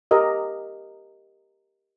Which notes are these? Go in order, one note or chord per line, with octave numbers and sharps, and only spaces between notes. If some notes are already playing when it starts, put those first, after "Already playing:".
G4 A#4 D#5